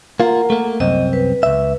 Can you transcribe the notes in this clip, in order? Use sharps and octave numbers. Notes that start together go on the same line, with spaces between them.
A#3 F4 A#4 F#5 A#5
A3 A#3
C2 F#2 C4 D#5
B4
C#2 E5